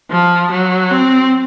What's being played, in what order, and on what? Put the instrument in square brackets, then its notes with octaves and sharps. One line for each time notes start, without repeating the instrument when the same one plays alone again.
[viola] F3
F#3
C4